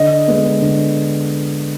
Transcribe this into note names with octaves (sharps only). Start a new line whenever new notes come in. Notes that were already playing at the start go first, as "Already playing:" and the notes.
Already playing: D3 D#5
G#3 B3
D3